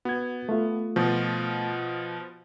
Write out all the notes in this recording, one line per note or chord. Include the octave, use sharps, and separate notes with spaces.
B3 F#4 G#6
A3 F4
B2 F3